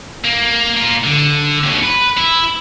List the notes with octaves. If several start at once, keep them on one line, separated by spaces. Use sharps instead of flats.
A#3
A#3 F4
D3
D#2 F#3
B4
E4